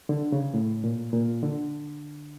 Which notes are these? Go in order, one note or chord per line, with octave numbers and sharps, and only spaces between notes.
D3
C#3
A2
A#2
A#2
D3